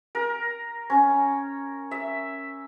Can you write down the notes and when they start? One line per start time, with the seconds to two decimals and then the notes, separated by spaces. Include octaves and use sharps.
0.15 A#4
0.90 C#4
1.91 E5